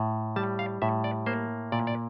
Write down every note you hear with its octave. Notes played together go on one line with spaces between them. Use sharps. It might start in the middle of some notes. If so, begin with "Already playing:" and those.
Already playing: A2
G3 A5
F5
A2 E5
D5
A#3 C5
A#2 D5
D5